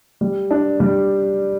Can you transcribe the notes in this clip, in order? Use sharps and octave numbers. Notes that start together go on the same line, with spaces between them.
G3
D4
G3